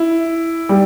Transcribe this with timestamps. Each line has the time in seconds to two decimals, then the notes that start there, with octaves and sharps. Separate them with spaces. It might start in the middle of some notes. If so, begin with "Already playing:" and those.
Already playing: E4
0.69 G3